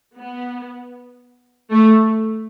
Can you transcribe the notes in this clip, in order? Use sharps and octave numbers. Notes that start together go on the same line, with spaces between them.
B3
A3